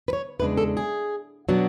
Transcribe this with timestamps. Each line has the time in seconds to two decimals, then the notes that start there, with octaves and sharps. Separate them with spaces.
0.08 B4
0.13 C#5
0.39 E2 C#3 G#3 D4 B4
0.57 A4
0.77 G#4
1.49 B2 F#3 B3 D4